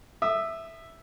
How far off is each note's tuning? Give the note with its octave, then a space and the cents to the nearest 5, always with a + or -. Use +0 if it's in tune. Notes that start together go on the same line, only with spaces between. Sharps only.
E5 +0 D#6 -30